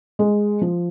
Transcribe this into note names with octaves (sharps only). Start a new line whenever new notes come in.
G#3
F3